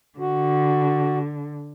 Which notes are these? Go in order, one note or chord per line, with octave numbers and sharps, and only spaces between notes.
D3 F#4